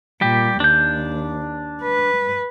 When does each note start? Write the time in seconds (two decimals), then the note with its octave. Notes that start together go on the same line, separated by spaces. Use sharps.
0.21 A#2 G3 G4
0.60 D#2 D4 G6
1.82 B4